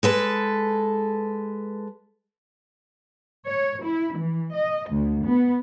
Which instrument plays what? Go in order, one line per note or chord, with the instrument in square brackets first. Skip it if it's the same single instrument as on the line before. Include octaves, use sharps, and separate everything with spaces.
[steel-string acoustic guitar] G#3 A4 B4
[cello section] C#5
E4
E3
D#5
D2
B3